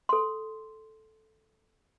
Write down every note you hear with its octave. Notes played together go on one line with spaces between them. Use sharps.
A4 C6